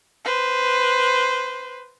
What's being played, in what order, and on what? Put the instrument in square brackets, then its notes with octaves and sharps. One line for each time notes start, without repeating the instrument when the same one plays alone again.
[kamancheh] B4 C5